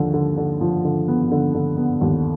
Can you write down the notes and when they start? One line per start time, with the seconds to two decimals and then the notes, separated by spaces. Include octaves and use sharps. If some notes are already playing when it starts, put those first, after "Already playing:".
Already playing: D#2 D3 F3
0.14 D3
0.37 D3
0.61 F3
0.85 D3
1.08 B3
1.31 D3
1.54 D3
1.77 B3
2.01 D#2